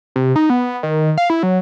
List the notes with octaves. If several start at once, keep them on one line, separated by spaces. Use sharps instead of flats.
C3
D#4
B3
D#3
F5
E4
F#3